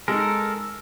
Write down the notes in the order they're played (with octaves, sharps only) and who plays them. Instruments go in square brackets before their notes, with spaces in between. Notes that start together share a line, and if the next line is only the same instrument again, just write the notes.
[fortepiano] G#3 D#4 [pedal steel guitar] A4 A#4